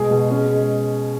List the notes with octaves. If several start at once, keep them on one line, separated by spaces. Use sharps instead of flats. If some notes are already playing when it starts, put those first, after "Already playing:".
Already playing: B2 G#3 G#4
B2
C#4
G#3